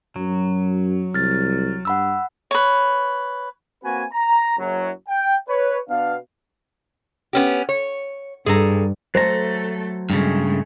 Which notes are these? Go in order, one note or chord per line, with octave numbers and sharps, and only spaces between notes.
F#2 F#3
C2 F6 A6
G2 F#5 B5 E6
B4 C#5
A#3 C4 F#4 B4 G#5
A#5
F#1 F#2 F#3
G5
B4 C#5
B2 B3 D4 F5
B3 C#4 G4
C#5
G2 G#4 A4 A#5
F#3 A3 A4 C5 A#5
G2 C#3 G#3 A3